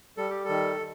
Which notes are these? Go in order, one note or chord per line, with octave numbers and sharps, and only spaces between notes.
G3 A4
G4
A4
D#3